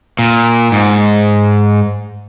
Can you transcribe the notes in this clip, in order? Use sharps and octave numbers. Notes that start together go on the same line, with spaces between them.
A#2
G#2